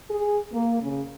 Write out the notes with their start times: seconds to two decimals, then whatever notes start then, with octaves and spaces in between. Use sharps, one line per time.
0.10 G#4
0.52 A#3
0.81 C#3